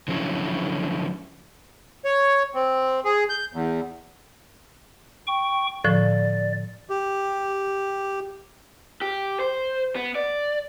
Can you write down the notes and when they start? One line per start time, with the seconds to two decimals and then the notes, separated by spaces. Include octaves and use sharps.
0.08 D3 F3 F#3 C#4 E4
2.05 C#5
2.54 C4
3.05 G#4
3.29 G6
3.53 E2
5.27 G5 C#6
5.85 A2 D3 F3 D5
6.90 G4
9.01 G4
9.40 C5
9.96 B3
10.15 D5